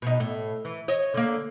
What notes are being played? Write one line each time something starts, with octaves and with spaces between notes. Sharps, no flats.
B2 D#4
A2
E3
C#5 D#5
D3 A#3